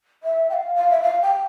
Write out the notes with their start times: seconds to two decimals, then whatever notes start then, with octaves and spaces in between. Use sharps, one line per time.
0.23 E5
0.50 G5
0.53 F5
0.75 F5
0.91 E5
1.02 F5
1.22 G5